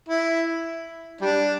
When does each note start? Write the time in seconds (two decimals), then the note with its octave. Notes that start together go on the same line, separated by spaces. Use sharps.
0.09 E4
1.21 G3 D4